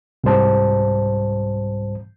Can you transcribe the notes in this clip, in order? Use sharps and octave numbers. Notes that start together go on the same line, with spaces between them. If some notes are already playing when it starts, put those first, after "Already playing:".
C2 G#2 G3 C5 A5